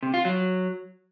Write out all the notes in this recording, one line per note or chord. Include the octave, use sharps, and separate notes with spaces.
C3
F4
F#3